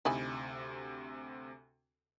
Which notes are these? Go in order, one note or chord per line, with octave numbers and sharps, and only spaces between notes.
D2 C3 D#4 E4 G#5